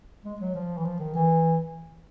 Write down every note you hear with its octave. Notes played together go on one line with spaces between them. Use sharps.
G#3
F#3
F3
E3
F3
D#3
E3